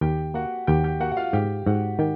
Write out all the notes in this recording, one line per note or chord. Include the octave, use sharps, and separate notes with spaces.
D#2 G4 G5
A#3 F#4 F#5
D#2 G4 G5
G4 G5
A#3 F#4 F#5
F#5
F4 F5
G#2 G4 G5
G#2 F#4 F#5
D#3 G4 G5